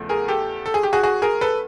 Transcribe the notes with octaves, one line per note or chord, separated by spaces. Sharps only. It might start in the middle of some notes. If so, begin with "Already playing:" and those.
Already playing: E2 C#3 F3 A3
G#4 A#4
G4 A4
A4
G#4
G4
F#4 G#4
F#4 G#4
G#4 A#4
A4 B4